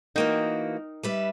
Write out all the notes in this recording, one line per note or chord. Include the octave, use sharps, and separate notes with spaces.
E3 A#3 D#4 F#4 A#4 G5
G3 B4 E5